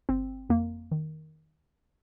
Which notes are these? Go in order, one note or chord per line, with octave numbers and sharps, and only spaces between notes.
G1 C4
F2 A#3
D#3